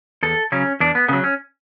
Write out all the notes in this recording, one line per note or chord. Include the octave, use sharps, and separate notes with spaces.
E2 A4
C#3 F#3 C#4
E2 D4
B3
C#3 F#3 B3
C#4